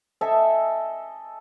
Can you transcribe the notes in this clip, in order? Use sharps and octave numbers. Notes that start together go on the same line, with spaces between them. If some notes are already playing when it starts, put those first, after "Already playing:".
A4 D#5 E5 G#5